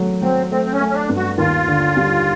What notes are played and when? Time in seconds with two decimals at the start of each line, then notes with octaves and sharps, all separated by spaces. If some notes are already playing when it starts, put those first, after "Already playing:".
Already playing: F#3 A3
0.22 F#3 C4
0.51 A3 C4
0.65 C4
0.74 C#4
0.80 A3
0.88 C#4
0.94 D4
1.09 G2
1.16 F#4
1.38 D#2 F4
1.68 D3
1.97 G3